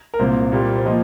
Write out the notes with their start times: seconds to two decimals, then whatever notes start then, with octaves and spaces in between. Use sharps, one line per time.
0.14 A#4
0.19 C2 A#2 A#3 C5
0.52 A#2 G3 A#3
0.76 C5
0.86 F3 A#3 D#5